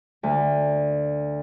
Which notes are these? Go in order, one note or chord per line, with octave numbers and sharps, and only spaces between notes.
D2